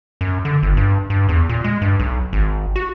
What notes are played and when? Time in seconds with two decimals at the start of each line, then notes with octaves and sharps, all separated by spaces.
0.21 F#2
0.45 D3
0.63 G1
0.77 G2
1.10 G2
1.29 E2
1.49 A#2
1.64 G#3
1.82 G2
2.00 B1
2.33 G#1
2.76 F#4